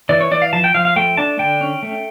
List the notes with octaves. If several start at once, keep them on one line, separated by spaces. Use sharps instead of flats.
E3 D5
C#5
E3 D5
F5
F3 A5
G5
F3 F5
F5
A3 G5
D4 A5
D3 G5
C#4
A3